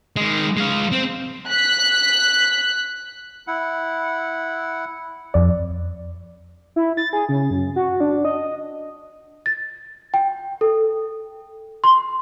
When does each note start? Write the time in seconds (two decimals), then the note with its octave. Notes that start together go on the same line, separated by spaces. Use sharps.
0.16 D#3 G#3
0.57 G#3 F5
0.92 C4
1.50 F#6 B6
3.47 E4 F#5
5.34 F2 D5
6.76 E4
6.97 A6
7.13 G#4
7.29 C#3
7.50 F#2
7.76 F#4
8.00 D4
8.25 D#5
9.46 A6
10.14 G5
10.61 A4
11.84 C6